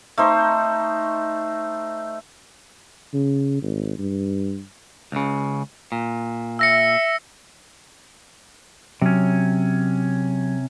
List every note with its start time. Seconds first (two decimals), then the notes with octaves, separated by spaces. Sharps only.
0.18 A3 D#4 C5
3.14 C#3
3.62 G#1
3.99 G2
5.12 C#2 C#3
5.92 A#2
6.59 E5 E6 A#6 C#7
9.02 C3 F#3 C#4